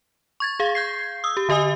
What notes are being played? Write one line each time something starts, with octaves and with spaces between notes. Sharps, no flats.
C#6 G#6 A6
G#4 F5
G6 G#6 C7
D#6 E6
G4
D3 G4 D#5 G#5 D#6